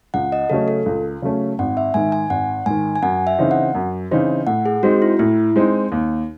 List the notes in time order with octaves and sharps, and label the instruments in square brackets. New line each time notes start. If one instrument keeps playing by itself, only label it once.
[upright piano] C#2 [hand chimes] F#5
[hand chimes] D#5
[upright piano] C#3 F#3 A3 C#4 [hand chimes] A4
[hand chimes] A4
[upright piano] C#2
C#3 F#3 A3 C#4
[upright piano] G#1 [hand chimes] F#5
[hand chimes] E5
[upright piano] G#2 D#3 [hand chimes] G#5
[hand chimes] G#5
[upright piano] G#1 [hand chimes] F#5
[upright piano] G#2 D#3 [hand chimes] G#5
[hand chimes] G#5
[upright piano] F#2 [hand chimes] F#5
[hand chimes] E5
[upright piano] C#3 E3 C4 D#4
[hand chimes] F#5
[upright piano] F#2
C#3 E3 C4 D#4
[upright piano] A2 [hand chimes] F#5
[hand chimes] G#4
[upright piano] G#3 C4 D#4 [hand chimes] F#4
[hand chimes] E4
[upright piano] A2 [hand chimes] E4
[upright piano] G#3 C4 D#4
D#2